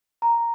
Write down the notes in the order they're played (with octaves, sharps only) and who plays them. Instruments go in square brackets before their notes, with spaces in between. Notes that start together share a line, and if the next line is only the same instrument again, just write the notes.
[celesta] A#5